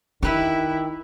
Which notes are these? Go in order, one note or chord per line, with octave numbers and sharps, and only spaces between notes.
D#3 D4 E4 G4 B4 E5